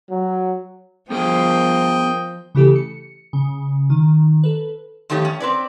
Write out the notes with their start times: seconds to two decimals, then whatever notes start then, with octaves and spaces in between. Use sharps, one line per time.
0.10 F#3
1.10 F3 B3 G#4 A#4 D#5 G5
2.55 C#3 E3 A3 G4 A4
2.76 C#7
3.33 C#3
3.90 D#3
4.44 A4 B4
5.10 F2 D#3 A3 G4 C#5
5.25 C#4
5.40 C4 B4 D5